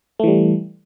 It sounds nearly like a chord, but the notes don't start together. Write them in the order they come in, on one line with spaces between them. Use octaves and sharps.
A3 E3 G3